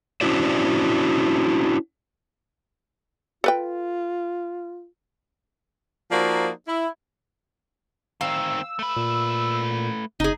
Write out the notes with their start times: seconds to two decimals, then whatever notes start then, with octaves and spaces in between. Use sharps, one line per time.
0.21 C#4 D4 E4 F#4 C5 D5
3.44 F4 A4 B4 G5
6.12 F3 A#3 D#4 F#4 C5 D5
6.68 E4
8.21 D#3 C4 F5 E6
8.79 A3 B4
8.96 A#2
10.20 F#1 D#4 G#4